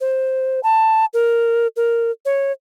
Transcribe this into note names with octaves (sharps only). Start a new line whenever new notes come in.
C5
A5
A#4
A#4
C#5